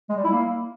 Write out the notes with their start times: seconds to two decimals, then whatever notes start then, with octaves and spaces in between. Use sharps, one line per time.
0.09 G#3
0.17 G3
0.24 E4
0.31 A#3